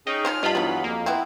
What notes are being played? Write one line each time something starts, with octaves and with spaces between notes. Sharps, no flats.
C#4 D#4 G#4 G5
F3 C#4 C5 F6
G2 F4 D#5 A5 B5
D#3 E3 F#3 G#3 B3
F2 A#3
B3 C4 E4